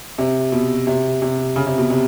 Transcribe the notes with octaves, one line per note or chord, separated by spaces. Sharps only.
C3
B2
C3
C3
C#3
C3
B2
C3